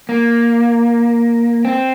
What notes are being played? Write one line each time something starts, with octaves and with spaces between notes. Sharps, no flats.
A#3
C4